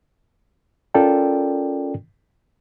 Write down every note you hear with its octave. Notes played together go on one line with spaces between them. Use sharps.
C#4 F4 A4 A#4 D5 G5